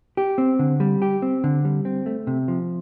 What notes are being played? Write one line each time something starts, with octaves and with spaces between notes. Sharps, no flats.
G4
C4
D3
G3
G4
C4
D3
G3
C4
A3
C3
F3